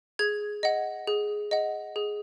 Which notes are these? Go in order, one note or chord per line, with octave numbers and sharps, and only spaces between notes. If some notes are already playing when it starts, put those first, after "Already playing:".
G#4 G#6
D#5 F#5
G#4
D#5 F#5
G#4